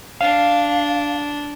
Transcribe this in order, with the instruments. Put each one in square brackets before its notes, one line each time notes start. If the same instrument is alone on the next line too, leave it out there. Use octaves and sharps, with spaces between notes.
[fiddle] D4 [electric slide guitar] F5